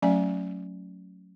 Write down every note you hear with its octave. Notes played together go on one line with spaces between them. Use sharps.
F#3 A3 C#4 D5 G#5